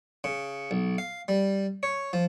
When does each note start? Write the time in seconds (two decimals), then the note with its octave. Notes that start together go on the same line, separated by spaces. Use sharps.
0.24 C#3
0.71 B1
0.98 F5
1.28 G3
1.83 C#5
2.13 F3